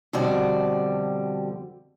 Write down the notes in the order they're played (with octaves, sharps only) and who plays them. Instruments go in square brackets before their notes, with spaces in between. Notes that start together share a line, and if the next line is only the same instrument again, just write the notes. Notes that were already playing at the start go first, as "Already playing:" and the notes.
[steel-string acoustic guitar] F2 B2 D3 G3 F#4 D5